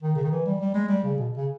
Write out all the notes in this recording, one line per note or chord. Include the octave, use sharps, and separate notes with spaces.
D#3
C#3
D#3
E3
G3
G3
G#3
G3
C#3
B2
C#3